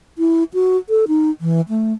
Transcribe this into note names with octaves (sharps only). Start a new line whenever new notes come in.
E4
F#4
A4
D#4
E3
A3